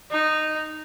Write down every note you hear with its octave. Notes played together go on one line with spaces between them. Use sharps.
D#4